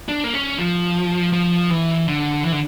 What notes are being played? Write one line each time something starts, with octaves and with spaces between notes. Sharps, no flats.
D4
A#3
C#4
F3
F3
E3
D3
E3
D3